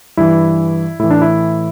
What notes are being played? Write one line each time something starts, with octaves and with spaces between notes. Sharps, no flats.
G2 E3 E4
A2 E3 E4
D4
E4